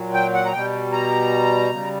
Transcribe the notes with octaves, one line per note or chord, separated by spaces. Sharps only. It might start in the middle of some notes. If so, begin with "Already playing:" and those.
Already playing: A#2 F#3
G5
F#5
A#5
B2 G3 G5
A#5
C#3 G3